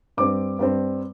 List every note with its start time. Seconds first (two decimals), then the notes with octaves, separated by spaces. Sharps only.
0.17 G2 G3 C4 D6
0.59 G2 G3 C4